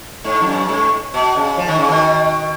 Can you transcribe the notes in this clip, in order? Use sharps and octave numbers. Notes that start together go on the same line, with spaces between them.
G#2
F2
F#2
G#2
B2
C#3
F3
D#3
C#3
B2 D#3